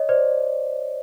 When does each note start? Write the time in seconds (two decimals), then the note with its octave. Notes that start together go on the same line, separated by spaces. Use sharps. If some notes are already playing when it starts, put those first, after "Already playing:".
Already playing: C#5 D#5
0.09 C5 D5